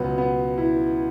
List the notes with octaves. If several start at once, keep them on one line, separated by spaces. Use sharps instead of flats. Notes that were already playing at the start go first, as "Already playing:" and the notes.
Already playing: C#2 B2 F#3 B3
B3
E4